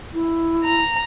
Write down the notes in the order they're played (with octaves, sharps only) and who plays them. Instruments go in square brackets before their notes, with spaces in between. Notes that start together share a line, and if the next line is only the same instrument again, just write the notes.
[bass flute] E4
[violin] A#5